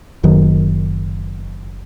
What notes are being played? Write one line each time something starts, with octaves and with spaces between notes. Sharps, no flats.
F#1 F#2 D#3